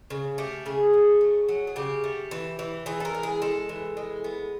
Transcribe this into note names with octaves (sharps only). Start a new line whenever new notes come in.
C#3
A3 G4
C#3 G#4
A3
F#3
F#3
G#4
C#3 G4
A3
E3
E3
E3 G#4
A4
A#4
G#3
G#4
G#3 A4
E3
G#3
B3